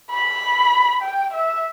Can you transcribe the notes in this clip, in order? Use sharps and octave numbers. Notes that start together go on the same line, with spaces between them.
B5
G5
E5